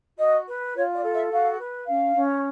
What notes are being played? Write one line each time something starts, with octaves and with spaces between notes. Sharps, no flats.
F#4 D#5
B4
F4 C#5
D5
A4
E5
F#4 F5
B4
C#4 F5
C#4